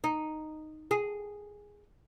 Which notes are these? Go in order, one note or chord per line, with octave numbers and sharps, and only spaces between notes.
D#4
G#4